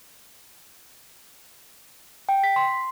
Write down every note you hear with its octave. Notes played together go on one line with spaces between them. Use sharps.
G5
B6
C6